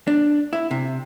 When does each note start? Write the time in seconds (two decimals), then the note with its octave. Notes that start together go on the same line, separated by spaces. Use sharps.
0.07 D4
0.53 E4
0.71 C3